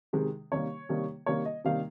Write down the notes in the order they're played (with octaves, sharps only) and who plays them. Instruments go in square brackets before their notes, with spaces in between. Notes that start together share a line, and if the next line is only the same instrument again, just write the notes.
[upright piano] C3 D#3 G#3
C3 D#3 G3 A#3 C#5
C3 D#3 G3 A#3
C3 D#3 G3 A#3 C#5
D#5
C3 D#3 G3 A#3 F5